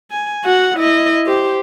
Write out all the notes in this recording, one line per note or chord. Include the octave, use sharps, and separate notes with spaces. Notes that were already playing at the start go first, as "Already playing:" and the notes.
G#5
F#4 F#5
E4 D#5
G4 C5